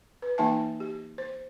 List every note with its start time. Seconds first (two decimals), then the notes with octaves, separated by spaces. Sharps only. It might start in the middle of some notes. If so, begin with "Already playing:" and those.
0.22 B4
0.38 E3 A#3 D#4 E5 G#5 A5
0.80 G4
1.18 C5